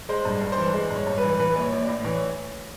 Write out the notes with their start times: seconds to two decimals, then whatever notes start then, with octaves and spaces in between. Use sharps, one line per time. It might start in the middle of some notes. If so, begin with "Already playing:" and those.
0.09 G#3 C5
0.25 G2
0.41 G2
0.52 C5
0.58 E3
0.74 G#3
0.90 G2
0.96 C#5
1.07 G2
1.18 B4
1.23 E3
1.39 E3 B4
1.56 A#1
1.61 C#5
1.72 A#1
1.83 D5
1.88 A2
2.04 E3 C#5